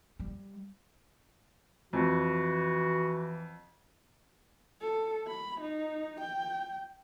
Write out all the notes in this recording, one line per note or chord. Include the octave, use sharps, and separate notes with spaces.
G3
F2 E3 F#4
A4
B5
D#4
G5